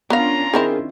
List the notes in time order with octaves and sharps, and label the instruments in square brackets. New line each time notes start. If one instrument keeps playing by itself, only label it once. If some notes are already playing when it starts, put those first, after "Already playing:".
[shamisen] B3 A#4 F5 [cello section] C#4 D4 F4 [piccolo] A#5
[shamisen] D#3 C4 E4 [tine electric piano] G#4 A#4